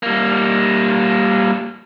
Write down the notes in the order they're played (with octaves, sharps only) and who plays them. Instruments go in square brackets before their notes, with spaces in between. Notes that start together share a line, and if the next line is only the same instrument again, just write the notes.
[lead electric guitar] G3 A#3